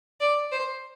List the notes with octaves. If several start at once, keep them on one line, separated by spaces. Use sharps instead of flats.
D5
C5